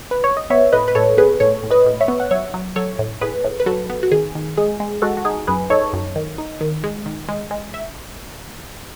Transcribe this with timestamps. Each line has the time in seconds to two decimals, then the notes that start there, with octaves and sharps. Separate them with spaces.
0.11 B4
0.24 C#5
0.37 D#5
0.50 B3 C#5 E5
0.73 A2 B4 D#5
0.88 B4
0.95 A2 A4 C#5
1.17 B3 G#4 B4
1.40 A2 A4 C#5
1.63 A2
1.71 B4 D#5
1.86 A2
2.01 C#5 E5
2.08 B3
2.20 F#5
2.31 F#3 C#5 E5
2.54 F#3
2.76 F#3 A4 C#5
2.99 A2
3.21 A2 G#4 B4
3.44 A2
3.60 B4
3.66 F#3 F#4 A4
3.90 B3
4.03 F#4
4.11 D#3 G#4
4.35 D#3
4.57 G#3 G#4
4.80 G#3
5.02 G#3 F#4 A4
5.17 F#4
5.25 D#4 G#4
5.47 F#2 G#4 B4
5.70 D#4 A4 C#5
5.93 F#2
6.16 D#3
6.38 D#4
6.61 D#3
6.84 G#3
7.06 D#3
7.29 G#3
7.51 G#3
7.74 E5